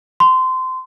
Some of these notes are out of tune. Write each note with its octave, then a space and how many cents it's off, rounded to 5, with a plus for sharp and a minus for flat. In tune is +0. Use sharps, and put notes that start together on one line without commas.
C6 -20